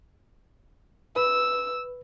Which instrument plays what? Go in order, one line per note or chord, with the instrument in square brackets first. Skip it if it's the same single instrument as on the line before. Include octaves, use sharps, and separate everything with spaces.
[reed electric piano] B4 [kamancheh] E6